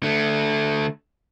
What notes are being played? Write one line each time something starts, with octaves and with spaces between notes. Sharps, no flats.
D3 A3